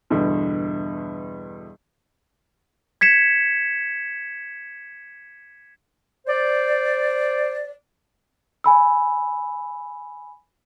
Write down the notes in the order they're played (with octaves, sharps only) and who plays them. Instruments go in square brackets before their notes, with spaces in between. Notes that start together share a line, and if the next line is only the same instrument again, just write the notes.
[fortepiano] E2 G2 B2 D3
[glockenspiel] G#6 B6 C#7 E7
[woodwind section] C5 D5
[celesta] G#5 B5 E6